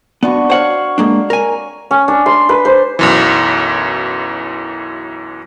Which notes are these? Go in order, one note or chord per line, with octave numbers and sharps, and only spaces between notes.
B3 D4 F#4 C#6
C5 C#5 F5 F#5
G#3 A#3 D4
A#4 G#5
C#4
D4
C6
B4
C5
B1 F#2 E3